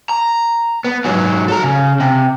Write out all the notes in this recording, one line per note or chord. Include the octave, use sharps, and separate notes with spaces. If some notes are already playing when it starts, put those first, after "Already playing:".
A#5
B3
G#2 F#3
A4 A#5
C#3
C3